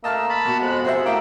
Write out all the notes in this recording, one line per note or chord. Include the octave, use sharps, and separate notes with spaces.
A3 A#3 D#5 A5 E6 F6
A5 B5
B2 F#4
F2 G#3 F#6
C3 F#4 G#4 C5 E5
A3 A#3 E4 G5 E6